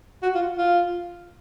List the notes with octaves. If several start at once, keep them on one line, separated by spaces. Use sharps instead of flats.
F#4
F4
F4